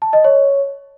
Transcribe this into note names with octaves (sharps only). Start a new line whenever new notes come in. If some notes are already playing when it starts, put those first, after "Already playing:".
A5
D#5
C#5